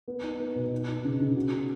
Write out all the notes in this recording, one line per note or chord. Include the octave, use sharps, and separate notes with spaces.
B3
D#4
B3
B2
D#4
D#4
C#3
C#3
F#4
B3